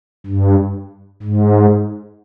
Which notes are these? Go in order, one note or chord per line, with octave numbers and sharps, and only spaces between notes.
G2
G#2